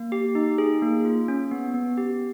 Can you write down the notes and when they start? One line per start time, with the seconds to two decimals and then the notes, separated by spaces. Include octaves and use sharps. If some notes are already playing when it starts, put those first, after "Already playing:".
Already playing: A#3
0.12 G4
0.35 D#4
0.58 G#4
0.82 A#3
1.05 F4
1.28 C#4
1.51 B3
1.74 B3
1.97 G4